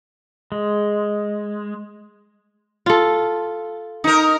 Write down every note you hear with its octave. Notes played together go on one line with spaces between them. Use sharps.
G#3
F4 A4
D#4 A#4